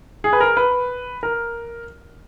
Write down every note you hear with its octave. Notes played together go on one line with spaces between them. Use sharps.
G#4
B4
A#4
B4
A#4